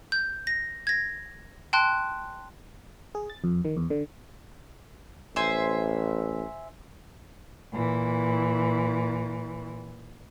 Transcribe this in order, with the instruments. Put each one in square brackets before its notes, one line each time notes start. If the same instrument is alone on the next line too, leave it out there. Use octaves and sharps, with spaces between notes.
[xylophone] G6
A#6
G#6 A#6
G5 A5 C6 F#6
[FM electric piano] G#4
A6
F2
D#3
E2
D3
[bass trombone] A1 [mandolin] C5 E5 G#5
[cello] A#2 E3